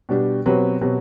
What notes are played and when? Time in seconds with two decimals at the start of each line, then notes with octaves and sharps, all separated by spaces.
0.09 B2 G3 D4 G4
0.46 B2 F#3 C4 G4 B4
0.81 B2 F#3 C4 G4 B4